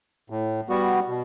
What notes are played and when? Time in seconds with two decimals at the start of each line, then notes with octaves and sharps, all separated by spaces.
0.30 A2
0.69 G3 B3 F#4
1.08 B2